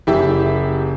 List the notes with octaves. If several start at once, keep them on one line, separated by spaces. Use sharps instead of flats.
F#1 E4 G4 E5